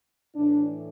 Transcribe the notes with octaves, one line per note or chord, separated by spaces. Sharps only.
A2 E3 D4